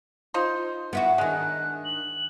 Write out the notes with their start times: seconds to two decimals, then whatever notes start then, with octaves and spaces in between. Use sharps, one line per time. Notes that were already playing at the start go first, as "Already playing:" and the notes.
0.34 D#4 F4 C5
0.93 B3 E4 F#4
1.18 D#3 G#3 D4 F#6
1.85 F#7